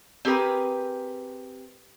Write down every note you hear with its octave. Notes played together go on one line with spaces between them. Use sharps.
C4 G4 G#4 A#4 B4